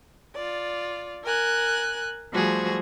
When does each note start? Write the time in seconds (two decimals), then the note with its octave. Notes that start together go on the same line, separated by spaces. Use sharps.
0.34 F4 D5
1.24 A#4 G#5 F#6
2.33 F3 G3 A3 F#4 G#4 C5